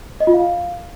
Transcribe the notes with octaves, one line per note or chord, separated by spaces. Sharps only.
D#5
F4
F5